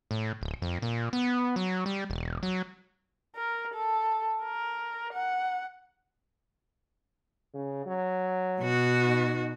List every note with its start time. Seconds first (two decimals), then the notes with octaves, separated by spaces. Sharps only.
0.11 A2
0.41 D1
0.62 F2
0.82 A#2
1.13 B3
1.56 F#3
1.86 G3
2.10 E1
2.43 F#3
3.35 A#4
3.74 A4
4.43 A#4
5.13 F#5
7.54 C#3
7.86 F#3
8.61 B2 F#4
9.06 D#4